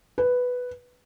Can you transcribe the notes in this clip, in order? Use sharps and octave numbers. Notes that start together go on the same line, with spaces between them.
B4